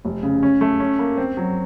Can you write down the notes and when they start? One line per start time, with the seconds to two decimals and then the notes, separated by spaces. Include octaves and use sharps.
0.05 F1
0.23 C#3
0.43 C#4
0.61 A3
0.80 C#4
0.99 A#3
1.18 C4
1.37 F#3